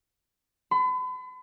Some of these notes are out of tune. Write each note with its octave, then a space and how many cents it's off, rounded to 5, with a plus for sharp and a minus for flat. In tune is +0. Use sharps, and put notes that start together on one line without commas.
B5 +40